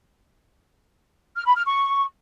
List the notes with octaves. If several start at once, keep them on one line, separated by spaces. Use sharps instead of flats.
F6
B5
F6
C#6